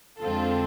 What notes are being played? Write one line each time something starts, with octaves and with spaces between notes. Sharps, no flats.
F2 D3 G#3 C4 F4 A4